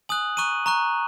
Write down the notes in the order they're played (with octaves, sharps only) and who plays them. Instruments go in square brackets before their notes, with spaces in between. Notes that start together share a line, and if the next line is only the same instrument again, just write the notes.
[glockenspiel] G#5 D#6 F#6 F#7
A#5 C#6 F#6 D#7
A#5 C#6 F#6